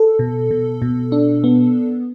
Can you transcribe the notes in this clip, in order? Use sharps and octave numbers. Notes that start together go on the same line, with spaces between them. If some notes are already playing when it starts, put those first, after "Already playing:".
Already playing: A4
B2
B2
B2
D4
B3